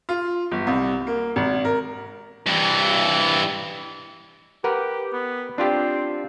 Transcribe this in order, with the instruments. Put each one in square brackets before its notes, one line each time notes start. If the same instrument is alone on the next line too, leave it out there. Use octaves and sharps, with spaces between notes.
[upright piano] F4
G1
C2
A#3
G#1
A#4
[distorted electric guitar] G2 E3
[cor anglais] G4 [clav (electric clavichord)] A#4 B4 F#5
[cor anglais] B3
[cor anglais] C4 [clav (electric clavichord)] D4 F4 G4